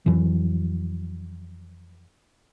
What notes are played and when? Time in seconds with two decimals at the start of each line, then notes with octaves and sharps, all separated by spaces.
0.06 F2 E3 F#3